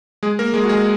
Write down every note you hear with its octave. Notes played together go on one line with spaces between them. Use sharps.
G#3 G#4
A#3 A#4
G#3 G#4
F#4
G#3 G#4